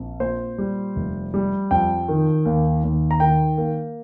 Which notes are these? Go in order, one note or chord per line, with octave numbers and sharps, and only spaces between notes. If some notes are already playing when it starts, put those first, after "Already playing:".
Already playing: A#1 C4
A#2 C5
G3
F1
G3
F2 G5
D#3
D#2
D#2
A#5
D#3 G5
A#3